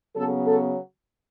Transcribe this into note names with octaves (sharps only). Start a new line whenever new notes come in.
C#3 F#3 B3 A4
A4